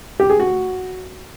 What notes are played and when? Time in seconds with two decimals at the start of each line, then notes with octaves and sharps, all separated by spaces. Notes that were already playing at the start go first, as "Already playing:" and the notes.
0.20 G4
0.30 G#4
0.40 F#4